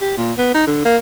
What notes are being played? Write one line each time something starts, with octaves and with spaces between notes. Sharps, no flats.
G4
A#2
B3
D#4
D3
A#3